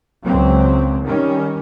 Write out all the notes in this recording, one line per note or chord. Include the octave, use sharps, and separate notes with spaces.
C#2 F#3 C4
D#3 G3 C#4